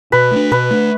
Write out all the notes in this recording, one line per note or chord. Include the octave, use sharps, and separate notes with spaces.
B2 B4
A3 D4
B2 B4
A3 D4